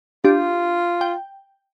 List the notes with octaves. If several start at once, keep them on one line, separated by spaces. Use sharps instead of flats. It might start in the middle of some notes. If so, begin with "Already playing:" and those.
D4 F4 G4
G5